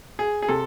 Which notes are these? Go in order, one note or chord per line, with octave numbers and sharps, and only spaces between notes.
G#4
G#4
C3 A4